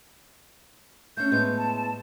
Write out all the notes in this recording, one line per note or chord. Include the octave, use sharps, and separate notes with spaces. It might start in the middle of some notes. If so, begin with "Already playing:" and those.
A3 C#4 G6
A2 G#3 B3
A5